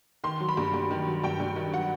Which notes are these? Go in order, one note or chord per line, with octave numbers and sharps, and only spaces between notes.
D#3 C6
F#3
B5
G2
G2
D#3
F#3
G2 G5
G2
D#3
F#3 F#5